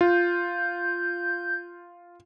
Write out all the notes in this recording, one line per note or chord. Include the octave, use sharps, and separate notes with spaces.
F4 G6